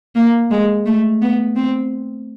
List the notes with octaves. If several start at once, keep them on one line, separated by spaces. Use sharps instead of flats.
A#3
G#3
A3
B3
C4